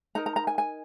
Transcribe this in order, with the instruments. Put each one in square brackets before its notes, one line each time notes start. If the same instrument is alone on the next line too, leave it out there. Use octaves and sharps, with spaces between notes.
[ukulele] D#4 A#4 A#5
A#5
A#5
G#5
G#5